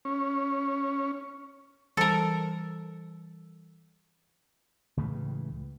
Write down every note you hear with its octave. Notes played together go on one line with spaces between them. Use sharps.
C#4
E3 G3 A4 A#4 E6
C#2 A2 C#3 E3